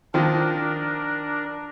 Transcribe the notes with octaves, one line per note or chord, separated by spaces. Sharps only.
D#3 F3 D4 A#4